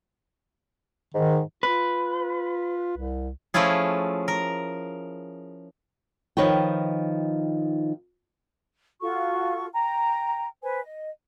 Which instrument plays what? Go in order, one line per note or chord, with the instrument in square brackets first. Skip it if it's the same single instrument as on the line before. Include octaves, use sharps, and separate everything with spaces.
[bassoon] G#2 [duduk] D#3
[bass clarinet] F4 [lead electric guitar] B4
[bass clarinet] C2
[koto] F3 A3 C#4 E4 F4 G#4
A#4
[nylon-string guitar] D#3 F3 D#4 B4 C#5 G5
[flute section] F4 F#4 A4 C#6
G5 A#5
B4 C5 G#5
D#5